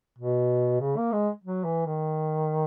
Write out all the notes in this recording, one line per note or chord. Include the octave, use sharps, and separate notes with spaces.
B2
C#3
A#3
G#3
F#3
E3
D#3